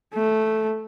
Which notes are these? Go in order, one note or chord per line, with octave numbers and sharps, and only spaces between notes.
A3